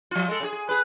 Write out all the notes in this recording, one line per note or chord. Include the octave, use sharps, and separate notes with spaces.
F3 F4
G#3 A4
C#3 G#4
G#4
G#4 B4